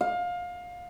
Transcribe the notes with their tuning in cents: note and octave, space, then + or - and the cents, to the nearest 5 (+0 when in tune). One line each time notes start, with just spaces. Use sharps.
F5 +25